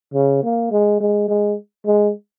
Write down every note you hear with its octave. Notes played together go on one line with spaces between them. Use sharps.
C#3
A#3
G#3
G#3
G#3
G#3